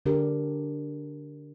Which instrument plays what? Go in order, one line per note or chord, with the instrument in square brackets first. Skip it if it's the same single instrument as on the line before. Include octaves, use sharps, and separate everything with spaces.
[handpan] D3 D4 G4 A#4